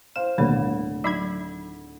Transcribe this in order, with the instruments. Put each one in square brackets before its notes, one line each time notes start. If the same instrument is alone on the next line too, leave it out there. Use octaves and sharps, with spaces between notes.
[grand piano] C5 F5 F6 [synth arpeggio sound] E7
[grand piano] D1 D3 [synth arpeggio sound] B2 G3 A#3 [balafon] D#3 A3 C#5
[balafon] F#3 D#4 [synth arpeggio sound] E5 B5 G#6